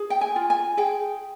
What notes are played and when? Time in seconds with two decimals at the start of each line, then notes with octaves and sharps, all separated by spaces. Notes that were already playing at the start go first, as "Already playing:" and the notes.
Already playing: G#4
0.10 G5
0.21 G#5
0.36 F4
0.50 G#5
0.77 G#4 G5